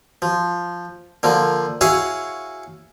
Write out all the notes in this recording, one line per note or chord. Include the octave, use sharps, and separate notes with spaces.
F3
D3 F3 A#3
E4 F#4 G#4 C#5 F5 F#5